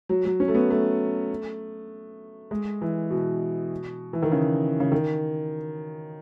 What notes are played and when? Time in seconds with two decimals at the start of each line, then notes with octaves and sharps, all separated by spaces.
0.09 F#3
0.25 F#3
0.40 C#4
0.48 A3
0.54 B3
0.70 A3
2.51 G#3
2.82 E3
3.10 B2
4.13 E3
4.22 D#3
4.32 C#3
4.80 C#3
4.92 D#3